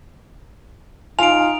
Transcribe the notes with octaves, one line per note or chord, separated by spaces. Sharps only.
D#4 F4 G#5 D7 F7